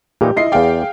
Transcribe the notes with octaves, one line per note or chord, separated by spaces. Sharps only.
A#2 E3 D#4 G4
E4 F4 D#5 C7
E2 G#4 D5 F5 G5